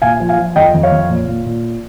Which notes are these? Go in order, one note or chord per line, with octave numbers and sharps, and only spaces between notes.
A#2 F5 G#5
F3
F5 G#5
F3
F2 D#5 G5
F2
C#5 F5
F2
A#2
A#2
A#2